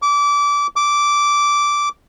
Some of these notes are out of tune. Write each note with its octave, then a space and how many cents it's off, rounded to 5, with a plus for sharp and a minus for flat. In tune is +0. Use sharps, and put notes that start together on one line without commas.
D6 -25
D6 -10